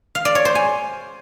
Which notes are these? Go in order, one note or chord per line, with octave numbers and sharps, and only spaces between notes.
F5
D5
C#5
C5
G#5